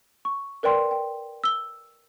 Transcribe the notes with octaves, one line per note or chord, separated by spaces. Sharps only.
C#6
A#4 B4 D5 G5 C6
G5
E6 G7